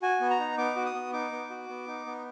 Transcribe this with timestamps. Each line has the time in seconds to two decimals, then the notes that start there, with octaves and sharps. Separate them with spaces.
0.02 F#4 G#5
0.20 B3
0.30 A#5
0.40 D#4
0.58 B3 D6
0.76 F#4
0.86 D#6
0.95 B3
1.13 D#4 D6
1.32 B3
1.50 F#4
1.69 B3
1.87 D#4
2.06 B3